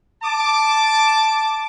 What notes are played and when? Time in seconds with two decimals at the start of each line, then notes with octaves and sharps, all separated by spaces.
0.24 A5 D6